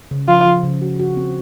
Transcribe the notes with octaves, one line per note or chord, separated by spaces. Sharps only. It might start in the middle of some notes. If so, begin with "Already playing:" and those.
C#3
F3 F4
F3
C#3
F#4
F#4
C4